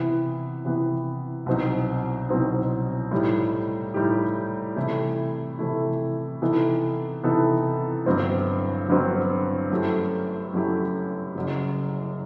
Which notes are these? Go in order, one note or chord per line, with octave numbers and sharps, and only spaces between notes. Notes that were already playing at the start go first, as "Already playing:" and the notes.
Already playing: C3 E3 B3
C3 E3 B3
C2 B2 F#3 C4 D#4
C2 B2 F#3 C4 D#4
A2 G3 D#4 G4
A2 G3 D#4 G4
C3 E3 A3 E4
C3 E3 A3 E4
C3 E3 B3 D#4 A4
C3 E3 B3 D#4 A4
G1 G2 F#3 C4
G1 G2 F#3 C4
F#2 F#3 A3 E4 G4
F#2 F#3 A3 E4 G4
F#1 F#2 F#3